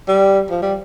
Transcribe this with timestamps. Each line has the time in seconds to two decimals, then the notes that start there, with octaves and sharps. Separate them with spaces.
0.08 G3
0.50 F3
0.62 G3